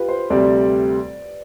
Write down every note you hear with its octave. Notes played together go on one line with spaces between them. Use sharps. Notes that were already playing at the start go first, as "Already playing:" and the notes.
Already playing: F4 G4 B4
C5
D2 C3 G3 D5